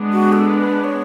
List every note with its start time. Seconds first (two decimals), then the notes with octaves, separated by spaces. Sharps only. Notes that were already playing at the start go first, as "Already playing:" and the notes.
Already playing: G#3 B3 D4
0.12 F#4
0.32 A4
0.53 B4
0.84 C#5